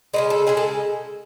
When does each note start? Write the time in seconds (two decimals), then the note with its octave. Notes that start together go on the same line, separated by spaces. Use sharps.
0.14 C#3 E3 G#3 D#5
0.30 A4
0.47 C#3 G#3 G#4
0.57 A4